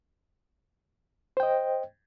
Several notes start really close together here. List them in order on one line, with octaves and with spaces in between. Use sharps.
C5 G5 D#5